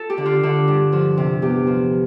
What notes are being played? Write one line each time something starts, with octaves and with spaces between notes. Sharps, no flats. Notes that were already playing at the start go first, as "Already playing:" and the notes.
Already playing: F4 A4
G4
D3
F4
D3
G2
F3
C3
E2 G4
F3